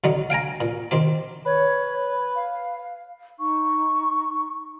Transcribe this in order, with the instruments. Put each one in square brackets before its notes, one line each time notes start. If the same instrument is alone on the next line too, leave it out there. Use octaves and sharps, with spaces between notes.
[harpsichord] B1 D3 F#3 D#4
F5 G5 G#5 A#5
A#2
D#3 C4 G4
[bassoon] B4 [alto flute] C#5
[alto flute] F5
[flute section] D#4 C#6